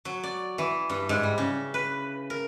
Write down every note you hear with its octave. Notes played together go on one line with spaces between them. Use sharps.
F#3
D5
E3
G2
G#2
G3
C#3
B4
A#4